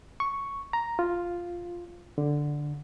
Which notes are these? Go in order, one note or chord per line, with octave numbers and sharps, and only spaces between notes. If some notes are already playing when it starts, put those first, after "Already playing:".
C#6
A#5
F4
D3